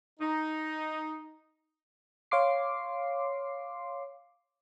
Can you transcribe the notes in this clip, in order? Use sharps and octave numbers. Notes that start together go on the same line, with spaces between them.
D#4
C#5 F5 C6 D6 C7